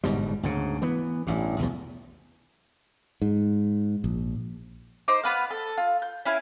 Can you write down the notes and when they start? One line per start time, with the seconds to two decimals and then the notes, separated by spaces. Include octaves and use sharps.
0.04 G1 G#2 B2 G3
0.43 D2 G#2 C#3
0.82 E3 B3
1.27 A1 G2
1.59 B1 E2 B2
3.22 G#2
4.04 A#1
5.08 D#4 C5 D6
5.23 B3 B4 F5
5.50 A4
5.77 F4
6.02 G6
6.25 C#4 E4 F5 G#5